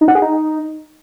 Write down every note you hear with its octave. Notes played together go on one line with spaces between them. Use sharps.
D#4
F#5
G#4
D#4